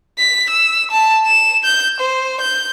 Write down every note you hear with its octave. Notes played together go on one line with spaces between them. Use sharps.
B6
E6
A5
E7
G6
C5
G6